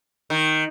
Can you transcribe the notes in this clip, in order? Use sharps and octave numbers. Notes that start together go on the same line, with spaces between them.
D#3